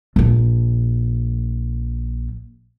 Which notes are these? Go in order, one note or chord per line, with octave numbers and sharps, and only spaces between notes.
A#1 F3